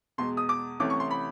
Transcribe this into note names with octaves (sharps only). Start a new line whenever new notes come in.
E2 B2 G#3 C6
D#6
D6
C2 C3 E3 A3 C#4 D6
C#6
C6
B5